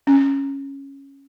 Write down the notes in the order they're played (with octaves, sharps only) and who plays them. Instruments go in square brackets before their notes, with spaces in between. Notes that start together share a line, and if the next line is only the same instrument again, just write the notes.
[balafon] C#4